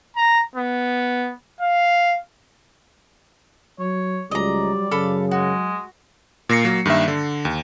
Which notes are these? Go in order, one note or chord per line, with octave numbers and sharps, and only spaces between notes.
A#5
B3
F5
F#3 C#5
C#2 F#3 G3 D5 D#5 A#5
F#2 C#3 F#3 A4 F5 B5
G#3 F#4
A#2 A#3 A#6 C7 C#7
F#3 A#3
G2 D#3 A#3 E5
D3
D#2